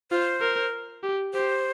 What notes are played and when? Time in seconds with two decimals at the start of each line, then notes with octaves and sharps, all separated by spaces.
0.11 F4 C5
0.41 A#4
1.03 G4
1.34 G4 C5